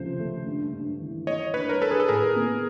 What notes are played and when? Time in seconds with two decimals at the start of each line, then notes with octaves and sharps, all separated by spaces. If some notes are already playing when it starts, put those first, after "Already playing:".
Already playing: C#2 C3 F3 A3 C5
0.19 A3
0.46 G2
0.73 G2
1.00 E3
1.27 A3 C#5 D#5
1.54 G2 B4 C#5
1.69 A#4
1.82 G2 A4 B4
1.91 G#4
2.00 A4
2.08 A2 G#4 A#4
2.36 B3